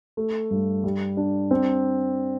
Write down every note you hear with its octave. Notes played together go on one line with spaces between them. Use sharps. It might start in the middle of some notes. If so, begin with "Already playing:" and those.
A3
G2
G3
D4
C4